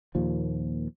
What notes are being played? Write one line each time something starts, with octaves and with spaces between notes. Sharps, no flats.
D#2 A#2 F3